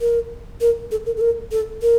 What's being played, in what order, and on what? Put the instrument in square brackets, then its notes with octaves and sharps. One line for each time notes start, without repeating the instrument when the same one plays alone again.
[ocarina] A#4
A#4
A4
A#4
A4
A#4
A4
A#4